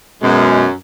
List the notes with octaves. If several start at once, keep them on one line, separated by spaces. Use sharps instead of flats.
F#2 B2 G#3